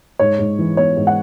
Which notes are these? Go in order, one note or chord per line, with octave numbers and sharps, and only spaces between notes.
G#2 C#5
G#2
E3
B3 C#5
G#2
F#5